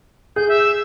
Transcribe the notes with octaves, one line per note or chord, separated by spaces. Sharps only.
G#4 G6
E5